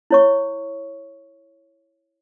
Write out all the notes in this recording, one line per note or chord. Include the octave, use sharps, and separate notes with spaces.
E4 C#5 C#6